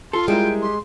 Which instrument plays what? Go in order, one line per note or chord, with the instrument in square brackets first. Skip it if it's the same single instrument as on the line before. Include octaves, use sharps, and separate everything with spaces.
[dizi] F4 [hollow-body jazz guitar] A4 [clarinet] C6
[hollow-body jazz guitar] G3 E4 A#4 [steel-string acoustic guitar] G#3 [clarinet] G5
[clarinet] G4 [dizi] C6